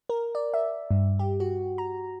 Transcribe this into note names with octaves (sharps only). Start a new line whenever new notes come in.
A#4
D5
E5
G2
G4
F#4
A#5